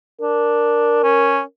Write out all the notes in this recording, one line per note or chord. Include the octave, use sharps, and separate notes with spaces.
D4 A#4
C#4